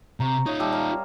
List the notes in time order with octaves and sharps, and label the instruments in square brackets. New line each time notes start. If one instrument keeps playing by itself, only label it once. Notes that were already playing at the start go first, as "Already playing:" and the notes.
[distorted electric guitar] C3 [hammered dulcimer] A#5 C#6
[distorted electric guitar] D#4 F4 [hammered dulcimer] C#5 D#5
[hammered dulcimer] G3 E5 A5
A#4 F5